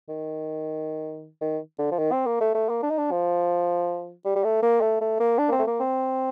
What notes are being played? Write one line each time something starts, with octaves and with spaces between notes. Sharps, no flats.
D#3
D#3
D3
F3
D#3
C4
A#3
A3
A3
A#3
D4
D#4
D4
F3
G3
G3
A3
A#3
A3
A3
A#3
D4
A#3
C4
A3
A#3
C4